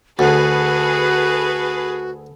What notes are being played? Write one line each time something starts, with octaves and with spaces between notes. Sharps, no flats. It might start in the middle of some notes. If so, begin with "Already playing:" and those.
D2 F#4 G#4 A4 B4